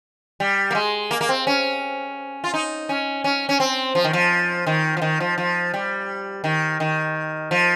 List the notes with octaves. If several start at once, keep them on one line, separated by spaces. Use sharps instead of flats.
G3
A#3
G#3
A#3
A#3
C4
C#4
F4
D#4
C#4
C#4
C#4
C4
F3
D#3
F3
D#3
F3
D#3
F3
F3
G3
D#3
D#3
F3